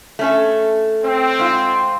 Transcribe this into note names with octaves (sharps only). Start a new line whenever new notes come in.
A3 C#4 A4
C4
G#2 F4